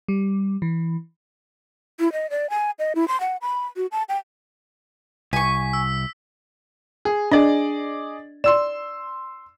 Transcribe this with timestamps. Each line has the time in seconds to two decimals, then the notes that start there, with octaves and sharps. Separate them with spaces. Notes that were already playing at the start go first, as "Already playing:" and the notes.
0.08 G3
0.62 E3
2.00 E4
2.13 D#5
2.30 D5
2.50 G#5
2.79 D#5
2.95 E4
3.08 C6
3.21 F#5
3.42 B5
3.77 F#4
3.92 A5
4.09 G5
5.33 C2 G#5 C#6 B6
5.73 E6
7.05 G#4
7.32 D4 G#4 D5 D#5
8.44 D5 C6 E6 E7